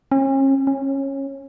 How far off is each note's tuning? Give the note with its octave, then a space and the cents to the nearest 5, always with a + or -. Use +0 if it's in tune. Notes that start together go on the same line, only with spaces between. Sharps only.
C#4 -40
C#4 -20